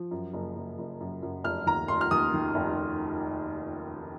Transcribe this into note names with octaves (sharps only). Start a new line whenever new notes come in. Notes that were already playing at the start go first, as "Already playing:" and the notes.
Already playing: F3
F#2
F#1
F#1
F#1
F#2
F#2
F1 F6
D#2 A#5
F1 C6
F6
D#2 D#6
D#3
F1